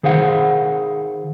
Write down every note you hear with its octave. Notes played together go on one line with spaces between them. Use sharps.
D#3 G#4 C5 F5 F#5